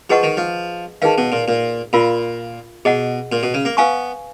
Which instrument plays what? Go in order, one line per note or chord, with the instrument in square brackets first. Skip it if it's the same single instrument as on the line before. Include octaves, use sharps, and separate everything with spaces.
[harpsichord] F3 [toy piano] G#4 B4 D#5 F#5 C#6
[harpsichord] D#3
F3
[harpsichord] D#3 [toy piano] D#4 G#4 B4 F5
[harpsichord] B2
A#2
A#2
[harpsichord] A#2 [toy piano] F4 A#4 F5 B5
[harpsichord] B2 [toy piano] G#4 D#5 F#5
[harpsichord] A#2
B2
C#3
A#3
[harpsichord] B3 [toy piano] B4 F5 G#5 C#6